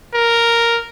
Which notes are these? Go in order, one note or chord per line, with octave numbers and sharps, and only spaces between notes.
A#4